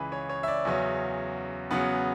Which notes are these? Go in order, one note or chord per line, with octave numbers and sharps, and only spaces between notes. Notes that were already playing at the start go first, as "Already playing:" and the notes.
Already playing: C#2 C#3 E3 B4
C#5
C#5
E5
D5
E2 C#3 F#3 C#4 E5
E2 C#3 F#3 B3 F#5